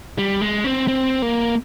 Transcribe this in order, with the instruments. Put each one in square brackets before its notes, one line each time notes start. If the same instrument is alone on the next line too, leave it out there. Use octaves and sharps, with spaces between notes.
[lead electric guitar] G3
G#3
C4
C4
A#3